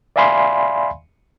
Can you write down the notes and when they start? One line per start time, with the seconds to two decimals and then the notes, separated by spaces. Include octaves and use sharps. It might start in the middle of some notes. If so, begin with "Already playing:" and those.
0.16 D5 E5 F5 G#5 B5 C6